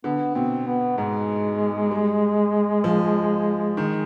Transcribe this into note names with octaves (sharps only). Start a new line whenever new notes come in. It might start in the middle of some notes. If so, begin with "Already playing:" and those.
D3 B3
B2 C4
B3
G#2 G#3
G3
F3
D#3